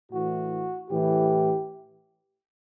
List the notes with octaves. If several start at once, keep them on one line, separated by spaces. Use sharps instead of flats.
A2 E3 F#4
A2 E3 G4